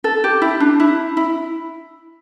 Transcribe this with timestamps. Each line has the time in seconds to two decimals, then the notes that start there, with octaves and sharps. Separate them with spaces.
0.04 A4
0.24 G4
0.42 E4
0.60 D4
0.80 E4
1.17 E4